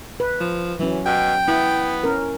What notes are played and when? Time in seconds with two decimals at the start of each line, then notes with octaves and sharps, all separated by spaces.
0.20 B4
0.41 F3
0.79 E3 F#3 C#4
1.06 B2 G5
1.48 B3 E4
2.04 C#4 A#4